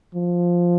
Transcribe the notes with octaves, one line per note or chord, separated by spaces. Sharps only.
F3